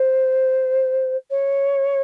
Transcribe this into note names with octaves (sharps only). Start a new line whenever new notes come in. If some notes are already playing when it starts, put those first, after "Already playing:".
Already playing: C5
C#5